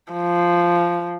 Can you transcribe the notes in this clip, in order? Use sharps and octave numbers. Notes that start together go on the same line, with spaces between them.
F3